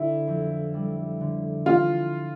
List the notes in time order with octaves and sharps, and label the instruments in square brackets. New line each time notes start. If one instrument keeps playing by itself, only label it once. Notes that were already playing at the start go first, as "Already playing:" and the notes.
Already playing: [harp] D3 [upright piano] E4
[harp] F2
G3
D3
[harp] E3 [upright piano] F4